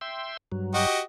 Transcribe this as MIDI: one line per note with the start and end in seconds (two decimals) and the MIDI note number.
0.01 0.37 76
0.01 0.37 79
0.01 0.37 84
0.52 0.86 43
0.52 0.86 54
0.74 1.01 66
0.74 1.01 67
0.74 1.01 75